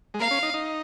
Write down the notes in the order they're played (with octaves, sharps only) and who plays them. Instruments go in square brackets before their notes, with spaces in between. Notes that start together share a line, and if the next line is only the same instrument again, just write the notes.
[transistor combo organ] G#3
[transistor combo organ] A#3 [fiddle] F5
[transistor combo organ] C#4
D#4
D#4